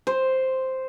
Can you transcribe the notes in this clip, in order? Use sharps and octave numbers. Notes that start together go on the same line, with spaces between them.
C5